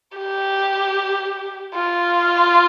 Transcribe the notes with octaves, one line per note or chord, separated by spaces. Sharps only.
G4
F4